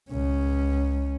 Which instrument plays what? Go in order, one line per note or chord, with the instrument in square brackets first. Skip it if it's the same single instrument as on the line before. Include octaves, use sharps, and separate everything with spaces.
[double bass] C#2 C#4